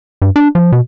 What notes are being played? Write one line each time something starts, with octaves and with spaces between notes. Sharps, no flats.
G2
D4
F3
B2